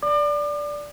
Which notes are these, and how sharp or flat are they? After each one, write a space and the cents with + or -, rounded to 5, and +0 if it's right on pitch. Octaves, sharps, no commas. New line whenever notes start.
D5 -5 D6 +40